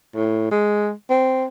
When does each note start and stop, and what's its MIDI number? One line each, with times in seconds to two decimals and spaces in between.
0.15 0.47 45
0.51 0.92 56
1.10 1.47 60